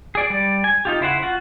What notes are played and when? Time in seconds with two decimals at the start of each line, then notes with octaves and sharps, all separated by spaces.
0.15 G#4 D5
0.30 G3 D5
0.64 G#5
0.85 D#4 F4 G4
1.00 C#3 E4 C5 F#5
1.23 F4 F#4 F#5